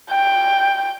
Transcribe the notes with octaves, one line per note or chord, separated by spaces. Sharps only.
G5